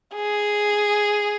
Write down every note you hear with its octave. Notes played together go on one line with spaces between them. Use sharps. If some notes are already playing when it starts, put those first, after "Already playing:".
G#4